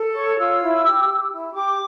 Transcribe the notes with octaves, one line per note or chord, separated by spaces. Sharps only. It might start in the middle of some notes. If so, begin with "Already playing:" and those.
Already playing: A4
C#5 C#6
F4 E6
E4
G4
G4
E4
G4 D6